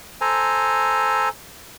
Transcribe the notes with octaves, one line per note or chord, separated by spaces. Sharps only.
A4 C5 G#5 A#5